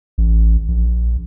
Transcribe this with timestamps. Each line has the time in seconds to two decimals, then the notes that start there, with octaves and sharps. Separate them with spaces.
0.18 A1
0.68 A#1